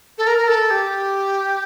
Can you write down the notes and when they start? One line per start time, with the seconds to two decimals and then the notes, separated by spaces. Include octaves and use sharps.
0.18 A4
0.27 A#4
0.37 A#4
0.48 A4
0.70 G4